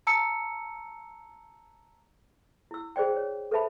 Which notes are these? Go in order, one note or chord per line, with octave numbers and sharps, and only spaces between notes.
A5 A#5 E6 C#7
E4 E6
G#4 C5 D5 G5
C#5
A4 B4 C5 E5 A5 B5